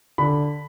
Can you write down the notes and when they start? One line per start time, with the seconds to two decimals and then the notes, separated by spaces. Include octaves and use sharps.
0.18 D3 B5